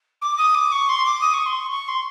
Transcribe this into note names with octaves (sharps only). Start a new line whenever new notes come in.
D6
D#6
D6
C#6
C6
D6
D#6
C#6
C6
C#6
C#6
C6